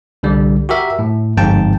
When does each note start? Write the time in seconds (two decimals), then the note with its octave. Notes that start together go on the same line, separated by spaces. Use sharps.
0.23 C2 D3 G3
0.69 F#4 G4 A#4 E5
0.99 A2
1.37 G1 F2 G#2 G5 A5